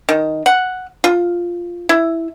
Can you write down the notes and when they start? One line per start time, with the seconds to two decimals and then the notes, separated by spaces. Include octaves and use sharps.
0.09 D#3
0.46 F#5
1.04 F4
1.89 E4